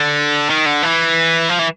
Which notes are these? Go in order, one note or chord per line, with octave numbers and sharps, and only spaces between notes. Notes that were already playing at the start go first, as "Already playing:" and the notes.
Already playing: D3
D#3
D3
E3
F3
E3